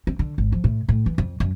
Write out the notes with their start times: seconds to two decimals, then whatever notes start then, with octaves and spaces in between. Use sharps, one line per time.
0.07 C4
0.19 D3
0.38 G#1
0.52 F3
0.64 A2
0.89 A2
1.06 E3
1.18 F2
1.40 F#2